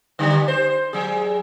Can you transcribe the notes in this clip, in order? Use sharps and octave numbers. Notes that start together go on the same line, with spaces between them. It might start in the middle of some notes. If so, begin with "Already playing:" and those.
D3 G3 D#4
C5
F#3 G#4